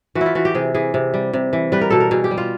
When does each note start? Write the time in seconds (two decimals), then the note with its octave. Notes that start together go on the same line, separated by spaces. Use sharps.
0.15 E3 F#4
0.21 E4
0.26 F4
0.35 E3 F#4
0.45 G4
0.55 C3 G#4
0.75 E3 G#4
0.94 C3
1.14 G3
1.33 C3
1.53 E3
1.72 G3 B4
1.81 A#4
1.90 B2 A4
2.00 A#4
2.11 B2 G#4
2.24 G4
2.31 G3
2.38 F4